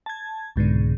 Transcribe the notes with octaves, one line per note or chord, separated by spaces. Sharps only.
A5 G#6
C2 G#2 B2 D3